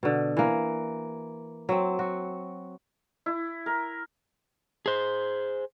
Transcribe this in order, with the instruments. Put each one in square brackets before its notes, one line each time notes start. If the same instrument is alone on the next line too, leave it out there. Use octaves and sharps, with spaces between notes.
[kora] B2 D3
E3 A#3
F#3 C4
F#4
[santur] E4
A#4
[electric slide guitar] G#4 C5